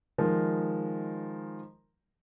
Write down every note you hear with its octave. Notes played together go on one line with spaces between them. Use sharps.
D#3 F3 G#3 A#4